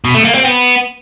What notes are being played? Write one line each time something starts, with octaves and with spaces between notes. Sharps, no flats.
B2
A3
A#3
C4
B3